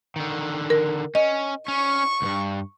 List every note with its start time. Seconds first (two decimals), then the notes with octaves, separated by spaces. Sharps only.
0.16 D3 D#3
0.70 A#4
1.15 C#4 D#5
1.68 C#4 C#6
2.22 C#2 G2